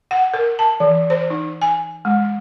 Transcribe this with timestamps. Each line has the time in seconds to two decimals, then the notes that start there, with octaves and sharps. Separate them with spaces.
0.11 F#5
0.34 A#4
0.59 A5
0.80 E3
1.10 C5
1.30 D#4
1.62 G#5
2.05 G#3